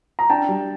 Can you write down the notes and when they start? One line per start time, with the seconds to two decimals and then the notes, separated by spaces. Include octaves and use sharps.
0.19 A#5
0.30 D4 G5 A5
0.49 G3